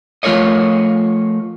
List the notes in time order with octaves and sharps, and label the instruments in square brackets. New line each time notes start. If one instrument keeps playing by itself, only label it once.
[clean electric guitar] F3 A3 F4 A#4 C#5 D#5